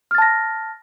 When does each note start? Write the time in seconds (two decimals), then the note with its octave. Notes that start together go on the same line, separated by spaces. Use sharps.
0.11 F6
0.15 A6
0.18 A5
0.22 A#6